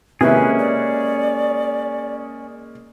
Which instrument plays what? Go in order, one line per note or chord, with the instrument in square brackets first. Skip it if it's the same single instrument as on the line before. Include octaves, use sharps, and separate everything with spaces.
[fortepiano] C3 E4 [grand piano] G#3 A#3 [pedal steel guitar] C#4 G#4 [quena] B4
[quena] D5